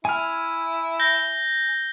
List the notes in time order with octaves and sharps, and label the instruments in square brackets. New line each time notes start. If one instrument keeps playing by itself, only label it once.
[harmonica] E4 [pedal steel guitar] G#5 F6
[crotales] G6 A#6 G7